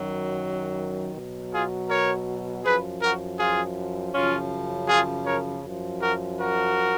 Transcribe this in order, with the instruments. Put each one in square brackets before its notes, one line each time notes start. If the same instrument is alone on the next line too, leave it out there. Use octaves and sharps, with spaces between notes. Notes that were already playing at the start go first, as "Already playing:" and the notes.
Already playing: [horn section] F#2 D#3 F#3
B2 F#3
F4 G#4
A#4 C#5
F#2 F3 G#4 B4
F#4 A#4
F4 G#4
F#2 C#3 F3 C#4 F4
F4 G#4
A#4 C#5
F#2 F3
F#4 A#4
F#4 A#4